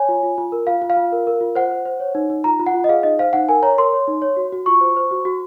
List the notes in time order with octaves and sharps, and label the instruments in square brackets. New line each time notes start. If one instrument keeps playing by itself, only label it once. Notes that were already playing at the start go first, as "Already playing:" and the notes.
Already playing: [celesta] C#5 G#5
F4
F4
F4
A#4
F4 F5
F4
F5
F4
A#4
A#4
F4
C5 F#5
C5
C5
C#5
D#4
D#4
F4 A#5
F4
F#5
F4
D#5
G#4 F5
D#4 D#5
C5 F5
D#4 F#5
A#4 G#5
C#5 A#5
A#4 C6
C#5
D#4
C#5
F#4
F#4
F4 C#6
C5
C5
F#4
F#4